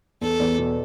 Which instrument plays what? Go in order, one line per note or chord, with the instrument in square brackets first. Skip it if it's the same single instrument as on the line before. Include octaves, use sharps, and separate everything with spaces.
[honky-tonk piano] E2 [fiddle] A4
[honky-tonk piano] E2
B2